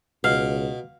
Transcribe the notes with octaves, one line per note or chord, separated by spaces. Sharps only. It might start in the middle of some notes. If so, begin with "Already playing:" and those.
C#2 B2 F5